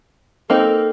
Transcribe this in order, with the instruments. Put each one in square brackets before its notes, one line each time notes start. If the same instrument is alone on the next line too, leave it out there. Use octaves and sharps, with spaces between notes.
[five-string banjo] A#3 C4 D#4 [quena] A4